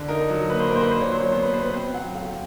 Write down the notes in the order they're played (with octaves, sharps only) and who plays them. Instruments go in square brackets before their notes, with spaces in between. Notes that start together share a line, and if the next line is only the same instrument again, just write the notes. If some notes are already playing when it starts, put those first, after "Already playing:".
Already playing: [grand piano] D3
D#4 A#4
F#3
A#3 B4
C5
A#2 A#4
C5
B4
D4 C5
C#5
F#3 C5
C#5
B3 C5
B4
B2 C5
B4
C4 C5
F#3 F#5
A3 F5